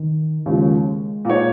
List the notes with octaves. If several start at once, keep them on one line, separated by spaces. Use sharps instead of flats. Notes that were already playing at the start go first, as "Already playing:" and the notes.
Already playing: D#3
D#2 C#3 F3 G#3
A#2 A#3 D#4 C#5